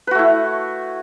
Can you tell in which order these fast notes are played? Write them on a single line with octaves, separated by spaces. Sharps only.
B4 F#4 A3 E4